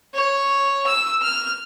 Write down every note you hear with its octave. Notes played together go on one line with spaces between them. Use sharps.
C#5
E6
F6